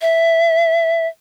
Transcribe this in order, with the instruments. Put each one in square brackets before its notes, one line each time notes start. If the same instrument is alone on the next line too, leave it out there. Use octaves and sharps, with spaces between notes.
[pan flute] E5